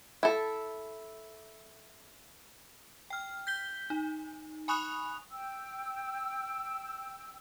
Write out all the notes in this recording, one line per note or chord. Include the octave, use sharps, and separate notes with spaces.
E4 A4
G5 F6
G6 B6 G7
D#4
G#5 B5 C#6 D#6 F#6 F7
G5 E6